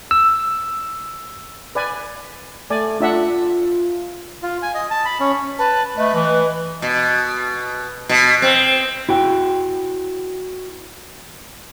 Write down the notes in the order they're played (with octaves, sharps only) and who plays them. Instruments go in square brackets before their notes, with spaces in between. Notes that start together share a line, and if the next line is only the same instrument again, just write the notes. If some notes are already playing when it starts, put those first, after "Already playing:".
[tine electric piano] E6
[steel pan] B4 D5 G#5
[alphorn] A3 [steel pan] D5 G#5
[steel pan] D4 E5 F#5 [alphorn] F4
[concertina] F4
G#5
D#5
A5
B5
C#4
[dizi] B4 [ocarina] A5
[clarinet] A3 [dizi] B4 [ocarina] D#5
[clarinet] E3
[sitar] B2
B2
C4
[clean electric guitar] E4 F#4 G5